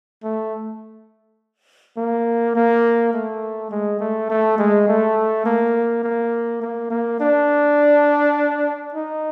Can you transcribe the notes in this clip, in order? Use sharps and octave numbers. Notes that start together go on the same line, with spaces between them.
A3
A#3
A#3
A3
G#3
A3
A3
G#3
A3
A#3
A#3
A#3
A#3
D4
D#4